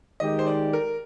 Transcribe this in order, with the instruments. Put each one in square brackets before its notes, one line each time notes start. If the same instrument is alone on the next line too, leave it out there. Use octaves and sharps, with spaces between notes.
[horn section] D#3 G#3 D#4 G4 [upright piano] D#5
[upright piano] C5
D5
A#4